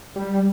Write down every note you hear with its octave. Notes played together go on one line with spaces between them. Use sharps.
G3